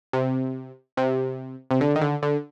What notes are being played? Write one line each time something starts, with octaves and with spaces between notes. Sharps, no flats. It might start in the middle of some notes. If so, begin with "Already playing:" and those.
C3
C3
C3
D3
D#3
D3
D3